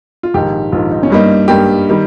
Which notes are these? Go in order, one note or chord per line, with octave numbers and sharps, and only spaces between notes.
F4
A#1 G#2 D#3 G4
A#1 G#2 D#3 F4
D#4
C#4
G2 G3 A#3 D#4
G2 G3 A#3 G4
D#3 G3